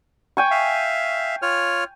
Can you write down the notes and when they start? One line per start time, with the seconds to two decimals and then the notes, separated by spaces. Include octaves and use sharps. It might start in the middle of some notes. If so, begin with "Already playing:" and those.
0.37 G5 G#5 C#6
0.51 E5 F5
1.42 F4 C#5 F6